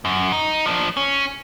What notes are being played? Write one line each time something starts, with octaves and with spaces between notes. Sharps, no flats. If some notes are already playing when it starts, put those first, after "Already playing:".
F#2
D#4
F3 D4
C#4